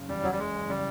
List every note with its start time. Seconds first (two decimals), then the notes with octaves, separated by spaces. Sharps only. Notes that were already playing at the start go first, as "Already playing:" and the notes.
Already playing: F#1 C#3
0.09 E2 G3
0.23 E2 F#3
0.32 G3
0.39 F#1 G#3
0.54 F#1
0.69 C#3 G3